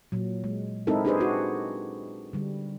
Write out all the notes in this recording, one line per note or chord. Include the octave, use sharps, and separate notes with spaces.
A#2 F#3
G#3
G#3 C4 D#4 E4 A4 A#4
D4 D#4 G4 G#4 B4 C5
D#4 F#4
D3 G3